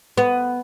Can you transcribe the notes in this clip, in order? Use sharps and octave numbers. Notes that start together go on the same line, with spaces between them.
B3